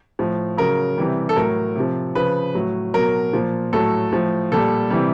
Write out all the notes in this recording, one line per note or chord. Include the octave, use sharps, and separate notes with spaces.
A2 F3
C#3 F#3 A#4
C3 E3 G3
A4
A2 F#3 A#4
C3 F3
C#3 F3 B4
A2 F#3
B2 F#3 A#4
A#2 F3
A2 F#3 A4
A2 F3
A#2 G3 A4
C3 E3 G3